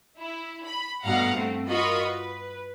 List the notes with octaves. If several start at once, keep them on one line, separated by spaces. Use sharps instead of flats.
E4
B5
G2 B2 A3 F5 F#5 A#5
A3 C4
F4 F#4 A#4 D#5 B5 C#6
B4